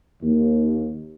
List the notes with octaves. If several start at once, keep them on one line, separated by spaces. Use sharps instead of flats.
D#2